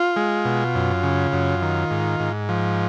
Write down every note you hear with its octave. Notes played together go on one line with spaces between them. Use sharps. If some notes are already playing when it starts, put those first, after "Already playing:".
Already playing: F4
G#3
B2
F#2
C#3
F#2
D#3
G#2
G#2
F3